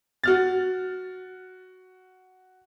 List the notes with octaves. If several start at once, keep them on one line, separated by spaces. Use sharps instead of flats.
F#4 F6 A6